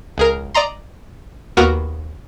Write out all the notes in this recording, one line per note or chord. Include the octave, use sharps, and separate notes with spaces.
C#2 G#4 A#4
D5 D#5 A#5 C6
D#2 A#3 B3 F#4 A#4 A#6